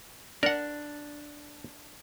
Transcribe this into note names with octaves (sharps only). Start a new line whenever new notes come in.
D4 A#4 F#5